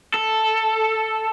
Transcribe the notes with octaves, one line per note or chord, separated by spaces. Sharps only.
A4